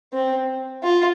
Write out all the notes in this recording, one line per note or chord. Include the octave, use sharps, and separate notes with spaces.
C4
F4